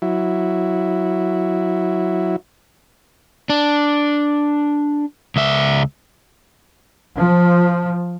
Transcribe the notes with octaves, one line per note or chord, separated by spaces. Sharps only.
F#3 E4
D4
C#2 E5
F3